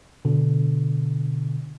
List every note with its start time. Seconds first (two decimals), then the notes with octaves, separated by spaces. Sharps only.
0.25 B2 D3